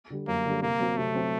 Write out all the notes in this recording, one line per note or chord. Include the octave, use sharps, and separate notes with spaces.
D3 G3
F#2 A#3
D3 G3
C3 A#3
F#3 C4
C3 A3
F#3 C4